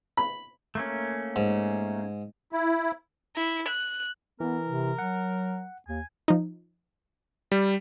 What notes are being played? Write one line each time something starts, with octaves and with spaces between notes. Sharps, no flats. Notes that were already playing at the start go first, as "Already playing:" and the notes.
B5
A3 A#3 C#4
G#2
E4
E4
F#6
E3 B3 A#4
C3
F#3 F#5
D#2 G#5
F3 D#4
G3